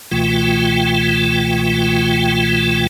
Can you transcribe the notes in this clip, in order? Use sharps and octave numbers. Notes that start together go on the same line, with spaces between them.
C#2 B2 E3 A3 F4 G5